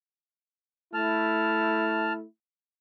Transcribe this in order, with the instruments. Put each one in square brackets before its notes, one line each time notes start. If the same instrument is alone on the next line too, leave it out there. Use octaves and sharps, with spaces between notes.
[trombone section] A3 E4 [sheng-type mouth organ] A5 F6